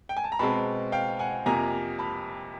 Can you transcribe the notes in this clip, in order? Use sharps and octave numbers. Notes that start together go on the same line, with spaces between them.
G5
G#5
A5
A#5
B2 G#3 C4 A5 B5
F5 G5
F#5 G#5
F2 C3 F3 A#3 G#5 A#5
A5 B5